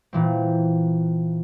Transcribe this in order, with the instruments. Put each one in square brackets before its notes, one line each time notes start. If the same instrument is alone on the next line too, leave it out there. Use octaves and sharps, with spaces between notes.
[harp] A#2 E3 C4